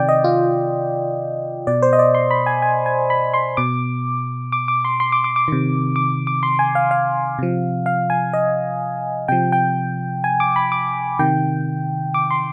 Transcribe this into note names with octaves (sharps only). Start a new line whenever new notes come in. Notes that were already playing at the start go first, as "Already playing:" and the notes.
Already playing: C3 D#3 D5 G5
D#5
F4
B2 D5
C5
D#5
D5
C6
B5
G#5
G#5
G#5
B5
C6
B2 D6
D6
D6
C6
C6
D6
D6
D6
C3 D#3
D6
D6
C6
G#5
F5
F5
C3 F3
F5
G#5
D#5
C3 F3 G5
G5
G#5
D6
B5
D6
C3 D#3 G5
D6
C6